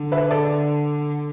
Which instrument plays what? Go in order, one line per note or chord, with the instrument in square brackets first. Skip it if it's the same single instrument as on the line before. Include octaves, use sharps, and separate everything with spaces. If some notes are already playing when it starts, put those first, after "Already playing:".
Already playing: [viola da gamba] D3
[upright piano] B4 E5
A4 D5